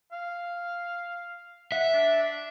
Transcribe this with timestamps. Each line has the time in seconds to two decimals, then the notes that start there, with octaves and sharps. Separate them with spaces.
0.12 F5
1.72 E5 F#5
1.93 D4